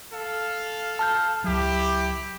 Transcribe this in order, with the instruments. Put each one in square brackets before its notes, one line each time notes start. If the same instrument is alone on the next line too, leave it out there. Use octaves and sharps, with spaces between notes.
[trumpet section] A4 F5
[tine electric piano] A5 F6 G6
[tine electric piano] C#2 F#3 [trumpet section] E4 G4